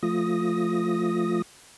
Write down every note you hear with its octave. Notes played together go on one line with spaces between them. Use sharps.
F3 A3 F4 D#6 A#6